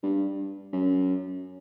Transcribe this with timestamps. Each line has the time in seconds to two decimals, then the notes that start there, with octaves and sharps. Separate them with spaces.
0.03 G2
0.72 F#2